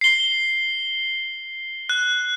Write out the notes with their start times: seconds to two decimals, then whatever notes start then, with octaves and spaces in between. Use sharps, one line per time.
0.01 C7 G7
1.89 F#6